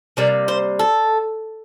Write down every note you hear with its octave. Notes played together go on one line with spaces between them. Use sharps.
C3 G3 A#3 D5
C5
A4